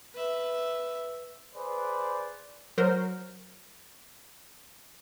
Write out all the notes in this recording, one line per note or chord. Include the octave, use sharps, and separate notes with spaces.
B4 E5
G#4 B4 C5 D5
F#3 A#4 C5